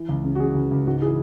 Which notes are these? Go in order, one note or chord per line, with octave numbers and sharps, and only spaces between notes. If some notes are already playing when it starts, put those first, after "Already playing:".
Already playing: E3
C#2
C#3
F#4
C#3 G#4
C#2
C#2
G#2 F#4
E3 G#4